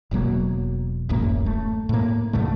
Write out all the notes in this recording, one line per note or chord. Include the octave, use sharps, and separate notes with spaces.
E1 B2 F#3 A#3
D1 A1 F#2 A#3
A3
A2 A#3
B1 G2 D3 A3